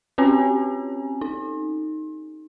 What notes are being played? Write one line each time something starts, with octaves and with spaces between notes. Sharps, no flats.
C4 C#4 F4 G4 C#5 G#5
D#4